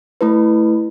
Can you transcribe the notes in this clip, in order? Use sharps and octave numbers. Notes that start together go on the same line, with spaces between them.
A3 E4 B4